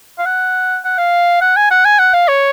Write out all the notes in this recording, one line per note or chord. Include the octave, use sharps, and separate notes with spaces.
F5
F#5
F#5
F5
F#5
G#5
F#5
G#5
F#5
F5
C#5